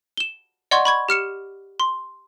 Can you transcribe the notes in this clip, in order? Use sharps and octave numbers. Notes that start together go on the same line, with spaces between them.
E7 G7
D5 D#5 F#5 C6 C#6 G#6
B5 C#6 G#6
G4 F6 C#7 E7
C6